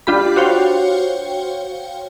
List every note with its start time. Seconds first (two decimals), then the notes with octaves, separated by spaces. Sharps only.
0.07 D4 F4 G4 B5
0.36 F#4 C5 C#5 F5 G5